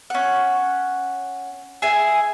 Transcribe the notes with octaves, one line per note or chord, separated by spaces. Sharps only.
C#4 F#5
G#4 E5 G#5